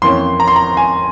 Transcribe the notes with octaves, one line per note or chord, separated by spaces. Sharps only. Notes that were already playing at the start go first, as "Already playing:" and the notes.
F2 E3 A#3 C#4 C6
A#5
C6
A#5
G#5